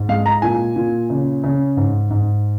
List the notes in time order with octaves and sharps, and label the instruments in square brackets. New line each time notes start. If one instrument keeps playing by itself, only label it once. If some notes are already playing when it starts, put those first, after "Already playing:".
Already playing: [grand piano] G#2
G#3 F5
A#5
A#2 G#5
A#2
C#3
C#3
G#2
G#2